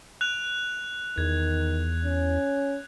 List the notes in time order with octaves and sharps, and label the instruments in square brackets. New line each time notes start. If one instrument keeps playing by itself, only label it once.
[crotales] F#6 F7
[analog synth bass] E2 [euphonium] D#3 [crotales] G#6
[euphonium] C#4